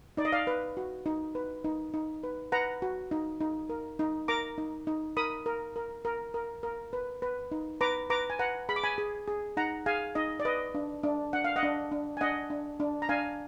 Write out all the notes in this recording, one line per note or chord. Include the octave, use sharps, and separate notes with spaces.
D#4 D5
D#5
D5 F5
B4
F#4
D#4
B4
D#4
D#4
B4
B4 F#5 A#5
F#4
D#4
D#4
A#4
D#4
A#4 A#5 D6
D#4
D#4
A#4 B5 D#6
A#4
A#4
A#4
A#4
A#4
B4
B4
D#4
B4 A#5 D6
B4 A#5 D6
G#5
B4 F#5 A#5
G#4 B5
D6
G#5 B5
G#4
G#4
D#4 F#5 A#5
G#4 F5 G#5
D#4 D#5
D5
B4 D#5
D4
D4
D4 F#5
F5
D#5 F#5
D4
D4
G#5
D4 D#5 F#5
D4
D4
A#5
D4 F5 G#5